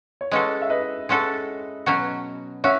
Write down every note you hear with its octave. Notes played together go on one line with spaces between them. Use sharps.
C#5
G#3 C#4 F#4 A4 B4 D#5
E5
B4 D#5
G#3 C#4 F#4 A4
B2 F#3 C#4 F#4
C#4 F#4 C#5 E5